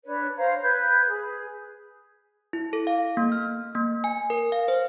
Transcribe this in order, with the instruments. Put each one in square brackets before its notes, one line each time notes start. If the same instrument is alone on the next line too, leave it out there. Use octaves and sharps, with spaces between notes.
[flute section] D4 B4 C#5
C5 C#5 F5 A#5
B4 G6 G#6
G#4
[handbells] E4
A4
F5
A#3
F6
A#3
G#5
A#4
F5
C5